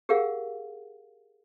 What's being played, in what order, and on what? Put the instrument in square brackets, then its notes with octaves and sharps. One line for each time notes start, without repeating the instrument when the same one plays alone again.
[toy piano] G4 G#4 A#4 F5 F#5